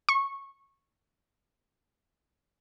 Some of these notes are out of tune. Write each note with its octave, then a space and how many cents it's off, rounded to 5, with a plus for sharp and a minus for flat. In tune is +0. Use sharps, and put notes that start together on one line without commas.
C#6 -15